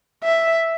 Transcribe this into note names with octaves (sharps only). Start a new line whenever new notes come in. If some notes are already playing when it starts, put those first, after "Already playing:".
E5